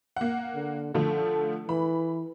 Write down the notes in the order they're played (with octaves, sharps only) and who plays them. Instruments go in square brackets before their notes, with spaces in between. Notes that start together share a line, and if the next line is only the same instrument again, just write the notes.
[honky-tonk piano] A#3 F#5
[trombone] D3
[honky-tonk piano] D3 F3 A3 [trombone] A4
[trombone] E3 [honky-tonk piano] B5